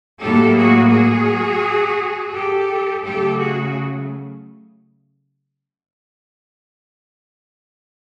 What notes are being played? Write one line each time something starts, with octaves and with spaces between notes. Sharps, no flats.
A2 F#3 A#3 G4 A4
F#4 G#4
F#4 G#4
G4 A4
C#3 F#3 A3 G4 A4
F#4 G#4